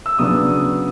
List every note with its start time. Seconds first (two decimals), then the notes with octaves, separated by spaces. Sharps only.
0.06 E6
0.19 C#3 F#3 B3 D4 D#6